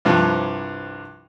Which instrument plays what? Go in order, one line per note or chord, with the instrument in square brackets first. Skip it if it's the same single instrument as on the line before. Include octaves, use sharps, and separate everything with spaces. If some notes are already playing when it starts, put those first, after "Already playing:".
[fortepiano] C2 G2 F3